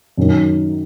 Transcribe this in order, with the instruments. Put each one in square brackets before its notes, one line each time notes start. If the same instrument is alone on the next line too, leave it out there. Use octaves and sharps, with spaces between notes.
[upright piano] F#2 D#3 F#3 C#4